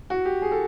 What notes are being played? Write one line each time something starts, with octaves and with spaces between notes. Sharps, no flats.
F#4
G4
G#4
A4